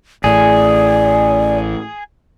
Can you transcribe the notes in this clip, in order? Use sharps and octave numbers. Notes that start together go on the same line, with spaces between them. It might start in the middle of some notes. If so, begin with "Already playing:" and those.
A1 A2 G#4 D5